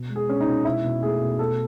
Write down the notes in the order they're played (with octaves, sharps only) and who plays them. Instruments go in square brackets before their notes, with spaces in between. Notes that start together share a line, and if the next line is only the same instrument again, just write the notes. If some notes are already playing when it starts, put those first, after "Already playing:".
Already playing: [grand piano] B2
G#3
G#4
G#3 C#4
D#4
B2
B2 E4
B2
A3 G#4
B2
A3 A4